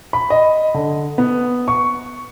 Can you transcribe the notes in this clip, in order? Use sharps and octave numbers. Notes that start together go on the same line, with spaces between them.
B5
D#5
D3
B3
C#6